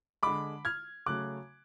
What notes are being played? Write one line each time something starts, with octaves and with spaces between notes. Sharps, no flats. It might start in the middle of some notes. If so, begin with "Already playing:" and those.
D3 G#3 B5 D6
F6 G#6
C#3 F#3 A3 D6 F#6